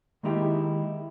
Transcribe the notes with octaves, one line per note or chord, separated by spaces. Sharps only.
D#3 G#3 A#3 D#4 E4 G4